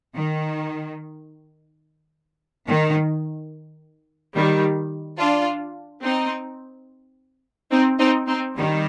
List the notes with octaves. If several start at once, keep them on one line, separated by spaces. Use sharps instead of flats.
D#3
D#3
D#3 G3
D4 F4
C4 D#4
C4 D#4
C4 D#4
C4 D#4
D#3 G3